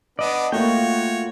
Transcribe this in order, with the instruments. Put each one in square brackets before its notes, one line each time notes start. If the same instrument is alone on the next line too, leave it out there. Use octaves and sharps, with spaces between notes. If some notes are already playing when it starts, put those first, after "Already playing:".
[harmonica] B3 D4 [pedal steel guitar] D5 D#5
[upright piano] A3 A#3 [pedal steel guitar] F4 F#4 G5 [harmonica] C#5